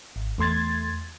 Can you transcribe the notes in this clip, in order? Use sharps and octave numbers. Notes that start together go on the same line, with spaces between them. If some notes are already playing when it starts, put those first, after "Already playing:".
G#1
E2 A3 C6 G#6 A6